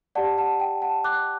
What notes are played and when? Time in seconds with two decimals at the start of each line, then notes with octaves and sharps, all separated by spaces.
0.15 G4 D5 F#5 A5
0.38 F#5 A5
0.60 G5
0.82 F#5 A5
1.04 D6 F#6